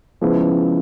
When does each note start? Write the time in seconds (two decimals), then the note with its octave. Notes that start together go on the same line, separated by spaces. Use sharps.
0.21 C#3 F3 G#3 B3 E4